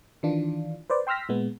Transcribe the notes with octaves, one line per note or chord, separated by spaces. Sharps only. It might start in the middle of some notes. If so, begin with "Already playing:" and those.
D#3 E3 D4 F4
B4 C5 D5
G5 C6 E6 F6 A#6 B6
A#2 G#3 B3